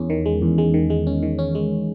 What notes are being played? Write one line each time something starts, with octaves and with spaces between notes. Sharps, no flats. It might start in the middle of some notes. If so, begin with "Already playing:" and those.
Already playing: E2 C#4
D#3
G#3
E2
G#3
D#3
G#3
C#4
D#3
C#4
G#3